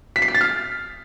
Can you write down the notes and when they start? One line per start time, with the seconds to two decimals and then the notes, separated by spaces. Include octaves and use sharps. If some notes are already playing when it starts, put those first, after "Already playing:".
0.16 B6
0.22 C7
0.28 B6
0.35 A6
0.41 F6